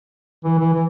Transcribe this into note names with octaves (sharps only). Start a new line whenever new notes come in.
E3
E3
E3